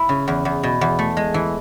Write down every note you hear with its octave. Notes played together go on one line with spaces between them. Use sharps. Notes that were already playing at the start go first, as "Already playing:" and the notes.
Already playing: E4
C#3
E2
E2
B2
E2
A3
G#3
E3